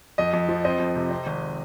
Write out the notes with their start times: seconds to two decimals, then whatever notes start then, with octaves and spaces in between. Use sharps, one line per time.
0.18 F2 D#5
0.33 F2
0.49 F3
0.64 C4 D#5
0.80 F2
0.96 C3
1.11 C4
1.27 G#1